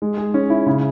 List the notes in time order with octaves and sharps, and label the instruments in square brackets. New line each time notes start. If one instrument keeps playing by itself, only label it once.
[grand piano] G#3
G#4
C#4
E4
C#3